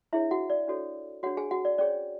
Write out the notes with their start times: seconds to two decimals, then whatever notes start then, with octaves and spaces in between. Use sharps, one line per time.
0.13 D4 E4 G#4 C#5 E5
0.31 F#4 F#5
0.50 D5
0.68 D4 F#4 A4 C#5
1.23 D4 F#4 G#4 C#5 F#5
1.37 G#4 G#5
1.51 F#4 F#5
1.65 D5
1.78 C#4 G#4 C#5 D5